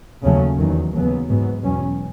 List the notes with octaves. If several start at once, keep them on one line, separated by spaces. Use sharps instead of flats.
D#2 C#3 F#3 A3 C#4
E2 D#3 F#3
D#2 C#3 F#3 B3
G#2 F#3 B3
E2 B2 F#3 C#4